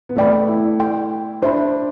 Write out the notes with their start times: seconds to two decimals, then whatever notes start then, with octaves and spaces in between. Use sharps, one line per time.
0.09 B3
0.16 A3 B4 D5 G5 B5
0.48 E4
0.79 A4 D5 G5 C6
1.42 D4 C5 E5 B5